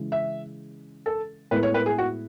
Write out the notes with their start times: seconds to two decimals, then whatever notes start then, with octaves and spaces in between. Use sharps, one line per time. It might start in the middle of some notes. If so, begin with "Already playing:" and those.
Already playing: C#3 E3 G#3
0.12 E5
1.06 A4
1.51 A2 G#3 B3 E4 A4 B4
1.63 C#5
1.74 B4
1.86 G#4
1.98 F#4